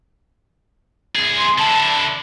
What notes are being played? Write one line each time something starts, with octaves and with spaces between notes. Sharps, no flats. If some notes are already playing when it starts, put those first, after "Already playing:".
C2 G#4
C6
D3 E4 A5